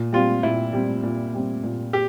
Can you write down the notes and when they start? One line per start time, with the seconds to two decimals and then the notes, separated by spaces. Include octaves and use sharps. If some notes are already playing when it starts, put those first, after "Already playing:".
Already playing: A#2
0.13 G3 C4 F4
0.43 A#2 E4
0.73 G3 C4
1.03 A#2
1.34 G3 C4
1.63 A#2
1.93 G4